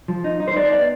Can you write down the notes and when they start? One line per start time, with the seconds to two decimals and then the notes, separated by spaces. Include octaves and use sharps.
0.08 F3
0.24 D#4
0.40 D#4
0.47 C5
0.56 D#4 D5
0.72 B3 D5